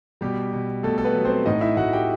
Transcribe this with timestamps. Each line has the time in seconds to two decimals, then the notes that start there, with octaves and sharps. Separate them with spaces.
0.21 B2 G3 G4
0.53 B2
0.83 B2 A3 A4
0.98 A4
1.04 B3 B4
1.15 F#3
1.25 C4 C5
1.46 A2 D#4 D#5
1.61 E4 E5
1.77 A2 F#4 F#5
1.93 G4 G5